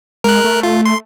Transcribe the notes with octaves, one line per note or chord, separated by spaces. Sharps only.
G#3 A#4 F#6
A3
F4
C6